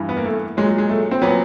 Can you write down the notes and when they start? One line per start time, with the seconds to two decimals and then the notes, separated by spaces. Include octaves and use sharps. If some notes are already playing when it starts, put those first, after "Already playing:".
Already playing: G2 E3
0.09 B3
0.17 A#3
0.25 A3
0.57 A#2 F#3 G#3
0.78 G#3
0.89 A3
1.11 C4
1.22 A#2 F#3 B3